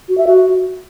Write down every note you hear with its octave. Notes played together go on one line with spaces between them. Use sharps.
F#4
E5
F#4